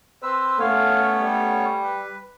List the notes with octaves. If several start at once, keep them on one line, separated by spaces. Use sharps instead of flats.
C4 B4 C5 E6
A3 B3 C#4 C#5 F5
G3
B4